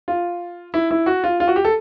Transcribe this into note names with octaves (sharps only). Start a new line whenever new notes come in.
F4
E4
E4
F#4
F4
F4
F#4
G4
A4